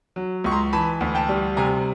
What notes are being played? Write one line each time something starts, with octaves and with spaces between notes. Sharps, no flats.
F#3
C#2 C#6
A#5 C6
E3 A5 B5
D2
G5 A5
G3
C3 G#5 A#5